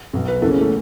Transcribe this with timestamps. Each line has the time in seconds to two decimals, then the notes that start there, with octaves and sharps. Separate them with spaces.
0.13 B1 B2
0.28 B4
0.42 F#1 E2 C#3 E3 A4
0.51 C#4
0.61 A3